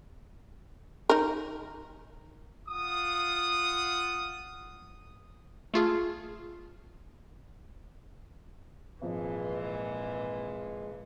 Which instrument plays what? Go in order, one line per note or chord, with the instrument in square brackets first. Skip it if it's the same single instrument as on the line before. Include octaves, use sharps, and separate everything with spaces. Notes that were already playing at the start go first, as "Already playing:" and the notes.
[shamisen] D#4 A#4
[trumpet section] F4 F#5 D#6
[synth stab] A3 F4 G#4
[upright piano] G#1 F3 [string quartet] A#2 E3 [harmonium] G#3